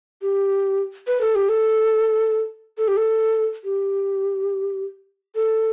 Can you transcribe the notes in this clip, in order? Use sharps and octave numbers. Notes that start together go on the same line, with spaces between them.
G4
B4
A4
G4
A4
A4
G4
A4
G4
A4